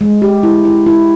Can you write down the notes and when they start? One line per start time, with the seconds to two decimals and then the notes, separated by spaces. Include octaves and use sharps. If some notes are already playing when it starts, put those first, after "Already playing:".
0.01 G#3
0.22 G4
0.43 E4
0.65 E4
0.86 E4